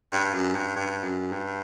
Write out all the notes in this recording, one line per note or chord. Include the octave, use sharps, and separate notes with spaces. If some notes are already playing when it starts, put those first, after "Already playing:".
G2
F#2
G2
G2
F#2
G2